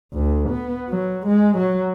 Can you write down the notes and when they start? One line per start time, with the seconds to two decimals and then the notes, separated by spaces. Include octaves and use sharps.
0.13 D2
0.50 B3
0.89 F#3
1.27 G#3
1.58 F#3